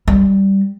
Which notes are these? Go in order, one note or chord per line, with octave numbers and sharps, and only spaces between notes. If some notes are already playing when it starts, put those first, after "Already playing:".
G3